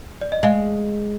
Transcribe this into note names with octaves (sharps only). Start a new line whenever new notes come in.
D5
D#5
G#3 F5